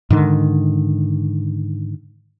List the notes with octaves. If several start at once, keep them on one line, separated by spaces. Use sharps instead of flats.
G#2 D3 D#3